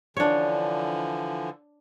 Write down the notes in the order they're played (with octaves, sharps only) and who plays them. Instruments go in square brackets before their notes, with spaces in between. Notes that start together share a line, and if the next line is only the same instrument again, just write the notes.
[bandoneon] D3 E3 F3 [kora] D4 C#5